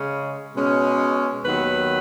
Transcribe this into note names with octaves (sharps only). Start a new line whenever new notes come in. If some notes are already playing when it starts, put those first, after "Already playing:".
Already playing: C#3 G#3 C#4
B2 G#3 C#4
D#2 D#3 F#3 B3 B4